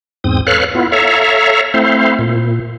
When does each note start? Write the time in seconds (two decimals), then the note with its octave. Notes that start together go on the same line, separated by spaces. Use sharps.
0.24 E2 G#2 C4 D#6
0.47 A4 B4 C#5 F5 F6 F#6
0.75 B3 E4 F4
0.92 A4 C#5 E5 F5 A#5
1.74 A3 C4 E4 C5 F5
2.19 A#2